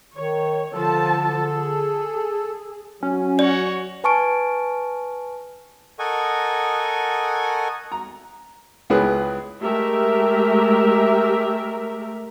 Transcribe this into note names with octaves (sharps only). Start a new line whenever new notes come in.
D#3 C#5
D3 F3 A4 A5
G#4
F#3 C#4
F#4 C#5 D5
B4 G#5 A5 C#6 F6 D7
A4 A#4 D#5 F#5 G#5 C#6
A#5
C#2 E4 G#4 B4
G#3 A3 G4 A#4 E5